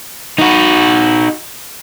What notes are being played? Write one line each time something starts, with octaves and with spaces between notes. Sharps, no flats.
D#4 F#4